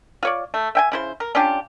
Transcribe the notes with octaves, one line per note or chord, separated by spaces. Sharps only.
F4 C#5 D5
A3
E5 G5 G#5
C#3 E4 C5
A#4
C#4 D4 F4 G4